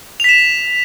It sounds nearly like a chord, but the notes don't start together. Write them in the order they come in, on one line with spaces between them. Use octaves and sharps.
F7 B6 E7